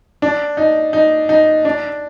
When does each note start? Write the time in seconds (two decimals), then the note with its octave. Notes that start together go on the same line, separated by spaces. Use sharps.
0.22 D4
0.57 D#4
0.93 D#4
1.29 D#4
1.65 D4